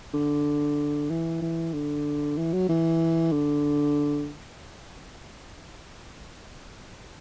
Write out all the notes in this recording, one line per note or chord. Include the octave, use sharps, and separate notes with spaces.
D3
E3
E3
D3
E3
F#3
E3
D3